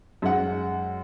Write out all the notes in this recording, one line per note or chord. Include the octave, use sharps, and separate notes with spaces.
F#2 G#3 F#5